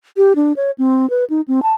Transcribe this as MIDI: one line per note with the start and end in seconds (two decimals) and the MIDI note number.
0.17 0.33 67
0.36 0.53 62
0.56 0.71 73
0.78 1.09 60
1.10 1.24 71
1.30 1.41 63
1.48 1.60 60
1.63 1.74 81